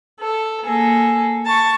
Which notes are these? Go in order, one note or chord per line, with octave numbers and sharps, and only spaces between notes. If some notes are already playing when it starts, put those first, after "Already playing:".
A4
A#3 G#4 A4
A5 C#6